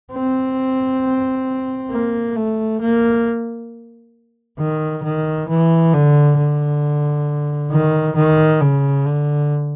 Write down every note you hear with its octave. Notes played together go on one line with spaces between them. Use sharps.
C4
A#3
A3
A#3
D#3
D#3
E3
D3
D3
D#3
D#3
C#3
D3